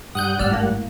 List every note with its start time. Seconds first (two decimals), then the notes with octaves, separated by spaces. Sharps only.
0.15 G2 F#5 D#6 F#6 G6
0.39 G#1 G#2 D5 E6 F6
0.51 A2 A#3